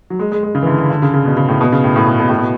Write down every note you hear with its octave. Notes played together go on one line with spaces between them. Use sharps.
F#3
G#3
G#3
G#3
C#3
E3
D3
D3
D3
C#3
C#3
B2
C#3
A2
B2
C#3
A2
A2
B2
B2
A2
B2